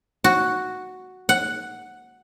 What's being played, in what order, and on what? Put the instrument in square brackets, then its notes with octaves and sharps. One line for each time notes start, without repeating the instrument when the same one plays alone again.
[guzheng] F#4
F#5